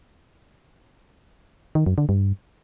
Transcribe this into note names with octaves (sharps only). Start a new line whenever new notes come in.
D#3
F#2
D3
G2